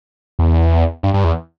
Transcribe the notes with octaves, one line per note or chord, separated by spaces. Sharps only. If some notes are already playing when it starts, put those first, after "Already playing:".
E2
G2
G2
E2